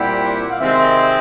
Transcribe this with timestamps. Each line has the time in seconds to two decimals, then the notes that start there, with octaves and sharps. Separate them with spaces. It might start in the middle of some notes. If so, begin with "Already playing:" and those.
Already playing: A#2 G3 C4 E4 G4 F#5
0.52 F5
0.59 C3 D#3 G#3 C4 E5